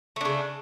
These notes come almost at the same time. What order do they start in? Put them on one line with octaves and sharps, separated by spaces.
A3 D4 C#3